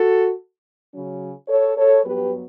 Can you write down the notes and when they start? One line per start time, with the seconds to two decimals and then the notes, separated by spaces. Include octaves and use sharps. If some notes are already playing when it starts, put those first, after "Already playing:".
Already playing: F#4 A4
0.93 C#3 F#3 C#4
1.48 A4 C#5
1.76 A4 C#5
2.04 G2 F#3 B3 G4 B4